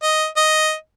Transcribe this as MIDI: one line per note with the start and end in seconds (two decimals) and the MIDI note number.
0.03 0.26 75
0.37 0.74 75